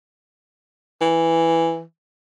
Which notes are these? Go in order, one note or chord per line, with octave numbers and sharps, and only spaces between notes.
E3